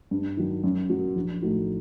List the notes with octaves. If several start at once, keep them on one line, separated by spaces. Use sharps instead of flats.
G2
D#3 F#3
F#2
F#3 A#3 F#4
A#1
A2 A3 D#4 F#4